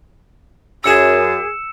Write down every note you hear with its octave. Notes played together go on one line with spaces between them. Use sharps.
F#2 G#4 E6 C#7 E7